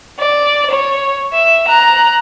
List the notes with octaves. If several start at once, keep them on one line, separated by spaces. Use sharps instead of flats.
D5
C#5
E5
A#5 F#6